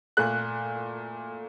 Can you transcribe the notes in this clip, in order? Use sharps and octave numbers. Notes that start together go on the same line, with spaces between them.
A#2 A3 F#6